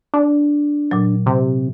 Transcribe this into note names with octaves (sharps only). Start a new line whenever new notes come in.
D4
A#2 F#3
C3